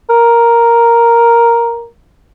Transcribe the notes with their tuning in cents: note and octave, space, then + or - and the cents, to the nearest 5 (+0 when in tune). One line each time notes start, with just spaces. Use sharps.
A#4 +5